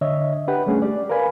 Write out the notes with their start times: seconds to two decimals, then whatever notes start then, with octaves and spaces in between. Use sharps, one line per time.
0.01 D3 C#5 D#5 E5
0.48 D4 G4 B4 F#5 G5
0.67 G3 A3 C#4 G#4
0.82 G4 D5
1.10 A#4 B4 F5 G#5 B5